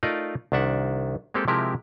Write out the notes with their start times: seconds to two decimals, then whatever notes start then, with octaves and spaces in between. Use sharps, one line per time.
0.03 A3 D#4 F4 A#4 D5 D#5
0.52 C2 D#3 D4 E5 F#5
1.34 G#3 A#3 C4 G4 A4
1.48 C3 F3 G#3 E4 G4 A#4